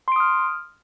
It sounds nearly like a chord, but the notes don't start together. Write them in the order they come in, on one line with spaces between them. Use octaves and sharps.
C6 D7 D#6 F6